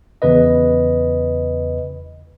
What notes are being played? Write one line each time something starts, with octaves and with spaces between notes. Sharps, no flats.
E2 C#3 B4 D#5